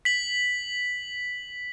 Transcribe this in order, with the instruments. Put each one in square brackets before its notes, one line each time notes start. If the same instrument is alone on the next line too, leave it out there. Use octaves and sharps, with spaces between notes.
[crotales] B6 F#7